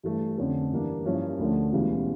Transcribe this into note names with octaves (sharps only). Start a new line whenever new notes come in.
G2 E3 A3
F2 D3 A3 C#4
G2 E3 G3 A#3 D4
G2 F3 A#3 C#4 E4
D2 D3 F3 A3 C#4
E1 D2 C#3 E3 G3